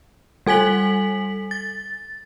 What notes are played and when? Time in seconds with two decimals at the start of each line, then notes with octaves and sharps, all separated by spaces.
0.46 G3 A4 G#5 B6 F#7
1.51 A6